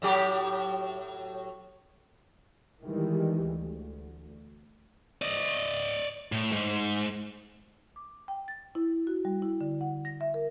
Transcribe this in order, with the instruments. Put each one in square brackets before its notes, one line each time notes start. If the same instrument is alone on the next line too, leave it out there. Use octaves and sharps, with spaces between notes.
[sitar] A2 F#3 G4
[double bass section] D#3 E3 G3 G#3
D2
[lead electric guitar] D5 D#5
A2
G#2
[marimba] D6
G5
A6
E4
F#4
G3
E4
D3
F#5
A#6
E5
A#4